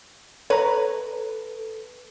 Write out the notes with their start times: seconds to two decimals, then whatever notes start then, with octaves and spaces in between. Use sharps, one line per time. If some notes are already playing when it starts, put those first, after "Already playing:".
0.50 A4 B4 C#5 A#5